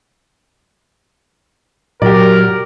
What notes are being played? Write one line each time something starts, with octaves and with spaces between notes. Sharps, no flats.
A#2 F#3 G4 A#4 D5